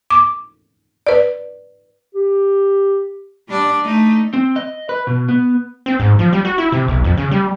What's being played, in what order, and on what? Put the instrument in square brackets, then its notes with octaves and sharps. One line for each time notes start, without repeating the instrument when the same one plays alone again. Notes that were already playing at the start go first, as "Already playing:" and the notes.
[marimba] D6
B4 D5
[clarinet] G4
[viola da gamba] G3 D4 D5
A3 D#4
[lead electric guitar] C4
D#5
B4
B2
B3
[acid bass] C4
G#2
F3
G3
F#4
E4
C3
B1
F2
C#3
G3